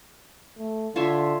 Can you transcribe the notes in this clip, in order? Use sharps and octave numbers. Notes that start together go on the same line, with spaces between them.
A3
D3 F4 C#5 E5